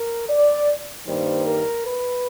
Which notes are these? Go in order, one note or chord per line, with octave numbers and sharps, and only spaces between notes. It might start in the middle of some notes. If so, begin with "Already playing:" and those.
Already playing: A#4
D5
G2 D#3 G3 A#3 C5
A#4
B4